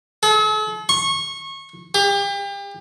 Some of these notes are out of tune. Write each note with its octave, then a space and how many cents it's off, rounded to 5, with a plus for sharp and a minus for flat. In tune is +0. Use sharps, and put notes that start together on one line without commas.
A4 -45
C#6 -25
G4 +35